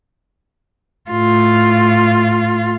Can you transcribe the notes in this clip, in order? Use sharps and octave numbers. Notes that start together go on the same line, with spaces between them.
A2 F4